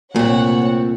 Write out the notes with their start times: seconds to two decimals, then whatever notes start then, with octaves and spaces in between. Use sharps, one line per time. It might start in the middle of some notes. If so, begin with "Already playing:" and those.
0.16 C2 A#2 A3 C4 C#5 F#5